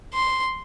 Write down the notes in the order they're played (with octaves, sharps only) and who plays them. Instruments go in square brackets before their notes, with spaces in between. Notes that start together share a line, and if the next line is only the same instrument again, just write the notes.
[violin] C6